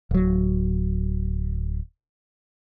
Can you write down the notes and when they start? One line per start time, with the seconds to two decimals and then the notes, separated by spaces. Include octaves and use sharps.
0.11 D1 F#3